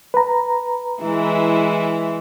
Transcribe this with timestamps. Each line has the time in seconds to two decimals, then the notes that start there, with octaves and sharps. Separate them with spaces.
0.14 B4 A#5
1.02 E3 G#3 E4